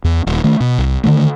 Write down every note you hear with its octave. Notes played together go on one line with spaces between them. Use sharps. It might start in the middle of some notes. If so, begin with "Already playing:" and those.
E2
D#1
D#3 A3
B2
C2
D3 D#3 A3